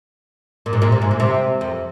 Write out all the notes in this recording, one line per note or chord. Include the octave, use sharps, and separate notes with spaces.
A#2
G#2
A#2
C3
G#2
A#2
C3
F2